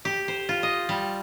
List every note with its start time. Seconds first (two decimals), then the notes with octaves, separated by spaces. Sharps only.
0.05 G4
0.28 C5
0.49 F4
0.63 D#5
0.89 G3